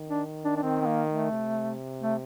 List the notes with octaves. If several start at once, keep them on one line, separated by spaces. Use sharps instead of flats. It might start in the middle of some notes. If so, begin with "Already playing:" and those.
Already playing: D#3
D4
D4
D4
D#3 C4
C4
A#3
A3
C3
A3